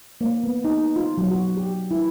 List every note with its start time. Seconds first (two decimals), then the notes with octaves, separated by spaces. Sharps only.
0.21 A#3
0.44 B3
0.64 D#4
0.96 F4
1.17 F#3
1.31 F#4
1.57 G4
1.91 E4